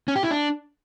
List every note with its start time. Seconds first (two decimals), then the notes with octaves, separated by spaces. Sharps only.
0.08 C#4
0.16 G4
0.23 E4
0.31 D4